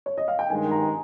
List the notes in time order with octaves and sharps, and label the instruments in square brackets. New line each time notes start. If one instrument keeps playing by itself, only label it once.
[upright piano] C#5
D#5
F5
G5
[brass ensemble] G2 D#3 G#3 [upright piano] G#5
[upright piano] A#5